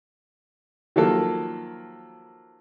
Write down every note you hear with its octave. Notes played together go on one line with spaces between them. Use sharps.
D#3 F3 F#3 A#3 A4